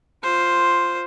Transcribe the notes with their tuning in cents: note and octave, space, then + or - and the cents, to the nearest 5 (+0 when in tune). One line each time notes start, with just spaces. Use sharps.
F4 +0 C5 +0